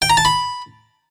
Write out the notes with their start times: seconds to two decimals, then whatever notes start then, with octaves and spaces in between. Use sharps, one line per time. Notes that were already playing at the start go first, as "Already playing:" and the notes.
0.02 G5
0.10 A#5
0.17 A5
0.25 B5